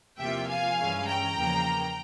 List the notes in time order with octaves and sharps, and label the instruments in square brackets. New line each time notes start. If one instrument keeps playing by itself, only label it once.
[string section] E2 C3 F3 A#3 F4 E5 G5
F5 G#5
G2 E3 G#3 C#4
G5 A#5
E2 C#3 F3 A#3